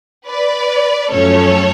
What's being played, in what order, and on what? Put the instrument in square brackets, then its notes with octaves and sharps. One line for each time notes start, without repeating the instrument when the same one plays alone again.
[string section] B4 D5
F#2 F3 A3 C#4 A4 C#5